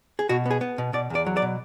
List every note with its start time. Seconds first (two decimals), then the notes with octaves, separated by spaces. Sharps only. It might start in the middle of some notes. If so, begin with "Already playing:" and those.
0.19 G#4
0.29 B2 F#4
0.46 B3 G#4
0.61 B3
0.78 B2
0.93 B2 D5
1.10 E2 D5
1.26 F#3
1.37 D5
1.42 B2